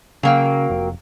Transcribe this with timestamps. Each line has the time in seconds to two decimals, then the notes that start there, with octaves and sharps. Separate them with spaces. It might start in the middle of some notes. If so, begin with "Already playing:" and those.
0.23 C#3 F#3 A#3 G5
0.70 F1